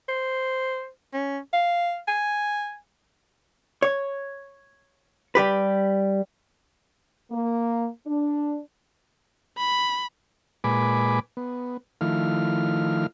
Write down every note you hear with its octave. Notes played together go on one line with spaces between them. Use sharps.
C5
C#4
F5
G#5
C#5
G3 G4 B4
A#3
D4
B5
A#2 G#3 B4 G#5 B5 D6
B3
D#3 F3 A3 E4 F5 F6